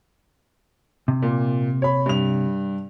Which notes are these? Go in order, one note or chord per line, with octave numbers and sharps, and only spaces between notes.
C3
A#2
C#5 B5
G2 F7